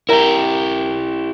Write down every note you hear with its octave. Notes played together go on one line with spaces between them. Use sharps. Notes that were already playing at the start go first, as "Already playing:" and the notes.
E4 G4 A#4 E5 A#5